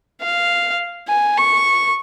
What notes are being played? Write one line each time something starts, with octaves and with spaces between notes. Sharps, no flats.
F5
G#5
C#6